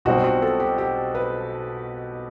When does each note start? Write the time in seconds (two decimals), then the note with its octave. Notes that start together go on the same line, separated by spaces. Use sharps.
0.05 B1 B2 G3 C4 F#4
0.24 F#4
0.42 A4
0.60 G4
0.78 G4
1.15 B4